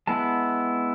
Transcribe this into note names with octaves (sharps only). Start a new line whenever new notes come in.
G#3 B3 E4 A5